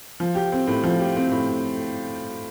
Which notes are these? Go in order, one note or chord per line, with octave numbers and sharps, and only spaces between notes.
F3
G4
C4
A2
F3
G4
C4
A2